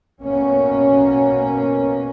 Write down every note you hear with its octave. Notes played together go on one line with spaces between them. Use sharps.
B2 A#3 C#4